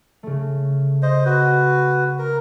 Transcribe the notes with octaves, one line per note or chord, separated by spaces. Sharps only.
C#3 A3
C5 D#5
F#4 B4
A#4